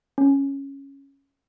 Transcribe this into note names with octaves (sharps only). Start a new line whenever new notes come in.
C#4